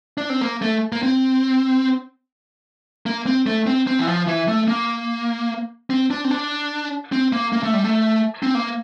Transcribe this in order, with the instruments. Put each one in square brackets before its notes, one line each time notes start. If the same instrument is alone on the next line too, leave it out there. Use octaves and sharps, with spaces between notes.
[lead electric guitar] D4
C4
A#3
A3
A#3
C4
A#3
C4
A3
C4
C4
E3
F3
E3
A3
A#3
C4
D4
C4
D4
C4
A#3
A#3
A3
G3
A3
C4
A#3